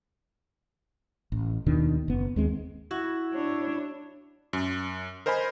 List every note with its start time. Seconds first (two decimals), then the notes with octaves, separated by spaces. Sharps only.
1.32 A1
1.66 D#2 B2 D#3 D4
2.08 F#1 B3
2.36 D#2 G#3 C4
2.91 E4 F#4
3.34 D4 C#5
4.53 F#2
5.26 A#4 C5 D#5 G#5 B5